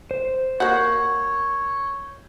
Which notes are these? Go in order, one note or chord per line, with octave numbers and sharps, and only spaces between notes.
C5
A#3 F#4 C#5 G6